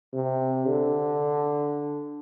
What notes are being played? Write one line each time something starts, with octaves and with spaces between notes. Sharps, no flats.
C3
D3